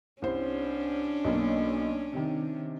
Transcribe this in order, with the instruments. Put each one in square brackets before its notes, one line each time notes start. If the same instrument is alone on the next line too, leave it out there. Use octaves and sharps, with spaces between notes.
[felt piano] C2 C5 [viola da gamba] C#4 D4
[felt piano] B1 A#3
C3 D#3